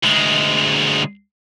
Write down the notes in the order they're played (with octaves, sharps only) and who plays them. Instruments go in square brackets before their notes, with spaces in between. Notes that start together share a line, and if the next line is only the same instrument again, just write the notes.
[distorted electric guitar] D2 G#3